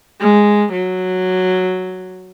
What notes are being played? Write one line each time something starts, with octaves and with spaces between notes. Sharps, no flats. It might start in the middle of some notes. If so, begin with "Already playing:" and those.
G#3
F#3